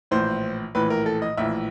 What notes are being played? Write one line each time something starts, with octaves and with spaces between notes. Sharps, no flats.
A#1 A2 E3 C5
A#1 A2 E3 B4
A#4
A4
D#5
A#1 A2 E3 E5